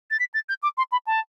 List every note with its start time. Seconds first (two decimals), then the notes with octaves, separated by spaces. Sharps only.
0.11 A6
0.20 B6
0.34 A6
0.49 G6
0.63 D6
0.78 C6
0.92 B5
1.07 A5